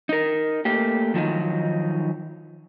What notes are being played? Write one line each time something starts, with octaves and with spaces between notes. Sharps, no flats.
D#4 A#4
A3 A#3 G4
D#3 F3 F#3 D#4